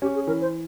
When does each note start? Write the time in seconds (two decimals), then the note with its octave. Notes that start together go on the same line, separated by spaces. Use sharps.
0.02 C#4 G4
0.15 G#4
0.27 E3 A#4
0.41 C5